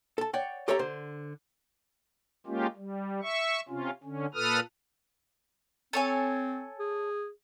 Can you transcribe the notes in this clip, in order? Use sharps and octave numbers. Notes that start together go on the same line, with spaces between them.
A4 A5
C#5 D5 F#5 G5
G4 A4 C#5 D5 E5 A#5
D3 C5
G#3 A#3 C#4 F4 G4
G3
E5 C#6
C3 C#4 F4
D3 C#4
A#2 A4 B4 D#6 F6
C4 A4 C#5 G#5
G#4